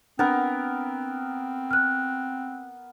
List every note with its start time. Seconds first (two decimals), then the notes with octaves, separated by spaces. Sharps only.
0.19 B3 C4 D4 A#4
1.71 F6 F#6